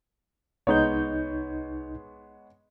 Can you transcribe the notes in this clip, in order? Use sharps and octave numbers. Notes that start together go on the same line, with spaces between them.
C2 G#3 B3 D#4 C#5 G6